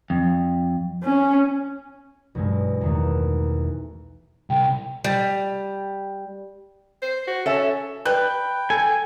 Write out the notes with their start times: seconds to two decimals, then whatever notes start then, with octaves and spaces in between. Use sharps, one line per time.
0.10 F2
1.03 C#4
2.35 B1 G2 E3 G#3
2.81 E2 D#3 A3
4.50 C2 G5
5.04 G3
7.02 C5
7.27 F#4
7.46 C#4 A4 E5
8.05 G3 B4 G5 F#6 G6
8.70 A4 G#5